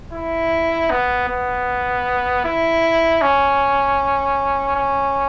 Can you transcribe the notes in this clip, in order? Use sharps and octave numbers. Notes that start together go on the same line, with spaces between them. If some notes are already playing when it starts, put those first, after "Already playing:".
E4
B3
B3
E4
C#4
C#4